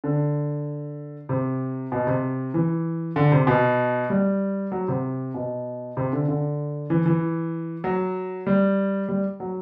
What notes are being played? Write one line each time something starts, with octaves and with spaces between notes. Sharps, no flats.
D3
C3
B2
C3
E3
D3
C3
B2
G3
F#3
C3
B2
C3
D3
D3
E3
E3
F#3
G3
G3
F#3